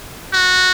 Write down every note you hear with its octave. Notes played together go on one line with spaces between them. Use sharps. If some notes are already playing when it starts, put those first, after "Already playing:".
F#4